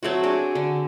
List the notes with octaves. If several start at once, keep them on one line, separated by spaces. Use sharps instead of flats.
F#3 A3 C4 F#4
D4 G#4
D3